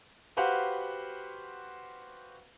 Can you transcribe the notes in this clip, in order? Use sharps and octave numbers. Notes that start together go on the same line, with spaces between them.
F#4 G4 B4 C5 F5 F#5